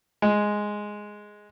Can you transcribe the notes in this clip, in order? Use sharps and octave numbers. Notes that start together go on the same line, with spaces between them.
G#3